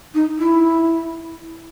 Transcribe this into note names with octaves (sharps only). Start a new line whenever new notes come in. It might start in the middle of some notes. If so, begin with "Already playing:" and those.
D#4
E4